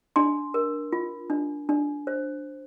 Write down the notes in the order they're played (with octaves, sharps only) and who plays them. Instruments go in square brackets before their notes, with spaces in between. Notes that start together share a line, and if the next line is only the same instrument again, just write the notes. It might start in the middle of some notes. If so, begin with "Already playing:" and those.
[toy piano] D4 C6
A#4
F4
D4
D4
C5